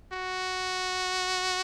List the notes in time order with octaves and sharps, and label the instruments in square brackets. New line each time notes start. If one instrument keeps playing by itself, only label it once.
[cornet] F#4